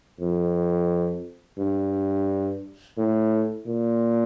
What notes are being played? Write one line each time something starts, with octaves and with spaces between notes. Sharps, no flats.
F2
G2
A2
A#2